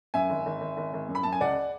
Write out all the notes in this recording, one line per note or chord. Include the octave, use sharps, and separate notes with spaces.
F#2 E5 G#5
G#1
G#1
G#1
G#1
G#1
F#2
B5
F#2 A5
G#5
C#2 D5 F#5